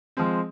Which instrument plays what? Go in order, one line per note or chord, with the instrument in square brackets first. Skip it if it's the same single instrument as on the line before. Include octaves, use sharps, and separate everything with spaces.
[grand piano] F3 G#3 C4